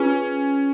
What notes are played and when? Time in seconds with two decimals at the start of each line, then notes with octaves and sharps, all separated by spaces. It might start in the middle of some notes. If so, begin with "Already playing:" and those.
Already playing: C#4 F4 G#4 B4